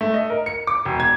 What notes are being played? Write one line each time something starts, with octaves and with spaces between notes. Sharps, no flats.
A3
D#5
A#4
C#7
D6
E1
G#6